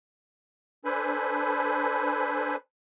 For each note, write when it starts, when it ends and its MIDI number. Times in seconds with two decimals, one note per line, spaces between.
0.85 2.56 62
0.85 2.56 69
0.85 2.56 71
0.85 2.56 72
0.85 2.56 80
0.85 2.56 83